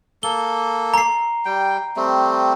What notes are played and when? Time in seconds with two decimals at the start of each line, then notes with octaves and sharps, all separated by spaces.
0.23 A#3 A4 G7
0.94 A#5 C7
1.46 G3 G5
1.96 G3 A3 C4